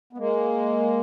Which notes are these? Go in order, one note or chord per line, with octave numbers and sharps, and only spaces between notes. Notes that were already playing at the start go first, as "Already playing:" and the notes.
B3
G#3 A#3